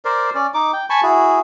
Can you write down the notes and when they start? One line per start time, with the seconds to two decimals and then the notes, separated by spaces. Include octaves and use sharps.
0.05 A#4 C5 D5
0.35 C#4 D5
0.54 D#4 D6
0.73 G5
0.90 G#5 A5 B5 C#6
1.03 E4 F#4 G#4